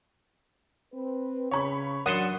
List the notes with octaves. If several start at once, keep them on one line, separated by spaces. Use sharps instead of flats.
C4 B4
C#3 C#5 B5 C#6
F#2 D4 D5 F#5 A5 C6 D#6